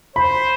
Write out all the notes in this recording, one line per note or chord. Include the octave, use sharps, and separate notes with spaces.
C5 B5